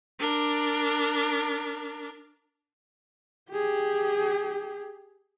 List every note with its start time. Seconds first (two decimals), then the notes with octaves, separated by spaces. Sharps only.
0.19 D4 A#4
3.51 G4 G#4